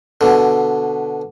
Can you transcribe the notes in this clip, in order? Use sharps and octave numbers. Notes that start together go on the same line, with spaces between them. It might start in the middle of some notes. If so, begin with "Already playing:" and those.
B2 D3